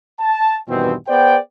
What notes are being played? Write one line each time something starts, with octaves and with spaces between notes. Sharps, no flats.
A5
E2 G2 B2 D#3 E3 C4
B3 G#4 C5 D5 G5